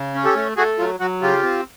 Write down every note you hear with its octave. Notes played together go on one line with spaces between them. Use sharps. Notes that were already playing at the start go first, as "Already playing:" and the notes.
Already playing: C#3
C#4
G4 A4
A3
A3 F#4 G#4
F#3 F4
F#3 F#4
C#3 F4 G4
C4